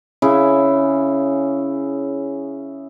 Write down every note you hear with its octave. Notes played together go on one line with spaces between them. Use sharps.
C#3 E4 G#4